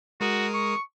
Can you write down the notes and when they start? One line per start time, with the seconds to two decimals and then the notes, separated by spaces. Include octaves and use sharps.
0.21 G#3 F#4 A#4 D#6
0.54 C#6